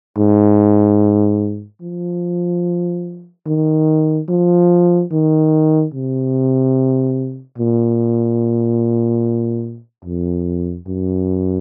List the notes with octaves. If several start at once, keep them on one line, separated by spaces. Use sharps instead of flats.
G#2
F3
D#3
F3
D#3
C3
A#2
F2
F#2